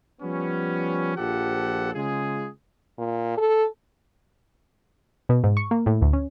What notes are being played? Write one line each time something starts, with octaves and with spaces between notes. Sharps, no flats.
F3 G3 B3 C#4
A#1 F3 G4 A4 F#5
C#3 G#3 F4 G#4
A#2
A4
B2
G#2
C#6
A#3
A2
D2
C#4